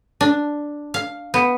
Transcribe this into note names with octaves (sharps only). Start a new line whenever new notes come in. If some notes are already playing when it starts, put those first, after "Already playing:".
D4
F5
B3